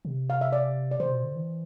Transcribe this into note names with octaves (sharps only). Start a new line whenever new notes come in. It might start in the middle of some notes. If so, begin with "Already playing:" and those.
C3
F5
E5
D5
D5
C3 C5
B2
D3
E3